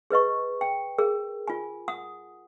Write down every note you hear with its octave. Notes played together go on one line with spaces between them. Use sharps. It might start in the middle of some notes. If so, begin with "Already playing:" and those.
G#4 B4 D#5 C#6
G5
G#4 A#4
F4 G#5
F#5 D#6